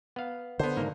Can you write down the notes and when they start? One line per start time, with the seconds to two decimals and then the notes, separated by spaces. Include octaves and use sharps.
0.16 B3 F5
0.59 D3 B3 C5
0.76 G#2 D#3 A#3